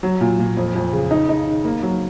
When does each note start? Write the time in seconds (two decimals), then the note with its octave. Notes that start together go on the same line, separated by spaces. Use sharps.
0.03 F#3
0.21 A#2
0.39 A#2
0.57 F2
0.75 F2
0.93 C#3
1.11 D#4
1.29 D#4
1.47 D#3
1.65 A#3
1.83 F#3